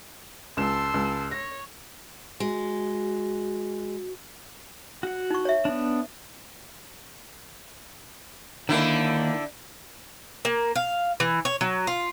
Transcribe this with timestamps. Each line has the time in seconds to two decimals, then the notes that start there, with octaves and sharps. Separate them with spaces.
0.57 C#2 A5 C6 E6 E7
0.94 C#2
1.31 C#5 A#6
2.40 G#3 F#4
5.03 F#4 F#5
5.31 D#4 C#6
5.45 C#5 E5
5.65 B3 D4
8.69 D3 D#3 A#3 E4
10.45 A#3
10.76 F5
11.20 E3
11.45 C#5
11.61 F#3
11.87 F4